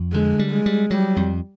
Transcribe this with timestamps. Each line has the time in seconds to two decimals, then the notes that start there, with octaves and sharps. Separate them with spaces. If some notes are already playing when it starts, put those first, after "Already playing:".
Already playing: F2
0.13 D3 G#3
0.39 G3
0.52 G#3
0.66 G3
0.91 F#3 G3
1.16 F2